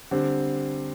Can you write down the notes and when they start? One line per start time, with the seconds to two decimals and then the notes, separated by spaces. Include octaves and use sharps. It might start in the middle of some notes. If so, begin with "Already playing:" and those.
0.11 D3 G3 C4